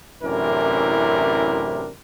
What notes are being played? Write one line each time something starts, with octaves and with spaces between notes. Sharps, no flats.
A1 F#2 C3 D4 E4 A#4